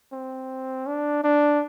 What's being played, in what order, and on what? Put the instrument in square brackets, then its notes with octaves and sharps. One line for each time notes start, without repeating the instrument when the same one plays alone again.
[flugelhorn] C4
D4
D4